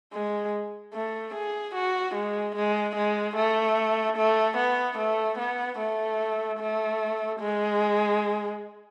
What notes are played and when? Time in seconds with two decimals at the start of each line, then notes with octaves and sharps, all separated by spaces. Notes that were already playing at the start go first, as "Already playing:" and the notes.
0.13 G#3
0.94 A3
1.34 G#4
1.75 F#4
2.15 G#3
2.56 G#3
2.96 G#3
3.37 A3
4.17 A3
4.57 B3
4.98 A3
5.39 B3
5.79 A3
6.60 A3
7.40 G#3